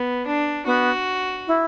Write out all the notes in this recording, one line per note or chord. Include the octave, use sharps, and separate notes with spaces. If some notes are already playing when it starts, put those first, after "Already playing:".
Already playing: B3
D4
B3 F#4
E4